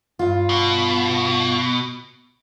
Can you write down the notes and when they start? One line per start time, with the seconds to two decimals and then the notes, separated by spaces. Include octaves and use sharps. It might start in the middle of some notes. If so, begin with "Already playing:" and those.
0.19 G2 F4
0.49 B2